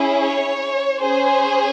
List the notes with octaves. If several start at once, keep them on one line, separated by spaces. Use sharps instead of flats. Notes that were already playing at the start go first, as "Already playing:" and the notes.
Already playing: C#4 E4 G#4
C#5
C#4 G#4 C5